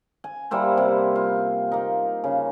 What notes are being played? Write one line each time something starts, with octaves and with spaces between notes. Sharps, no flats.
G#5
G3 A#3 E4 C5
C3
F4
A#3 D#4
C#3